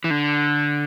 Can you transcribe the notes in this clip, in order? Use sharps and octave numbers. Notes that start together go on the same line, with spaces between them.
E3
D3